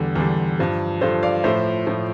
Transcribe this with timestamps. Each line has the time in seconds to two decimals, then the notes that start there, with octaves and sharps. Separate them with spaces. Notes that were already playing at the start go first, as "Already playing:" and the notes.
Already playing: E2 D3 G3
0.15 E2 D3 G3
0.59 G2 F3
1.01 G2 F3 A4 C5
1.23 D5 F5
1.44 A2 F3 C5 E5
1.87 A2 F3